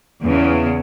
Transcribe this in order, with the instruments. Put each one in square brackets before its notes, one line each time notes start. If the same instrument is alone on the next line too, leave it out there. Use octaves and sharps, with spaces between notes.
[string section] E2 C#3